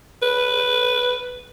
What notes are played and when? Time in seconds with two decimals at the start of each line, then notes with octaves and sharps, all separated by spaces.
0.22 B4